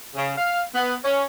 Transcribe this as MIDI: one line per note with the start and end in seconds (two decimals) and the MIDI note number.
0.15 0.32 49
0.37 0.62 77
0.74 0.94 59
1.04 1.25 61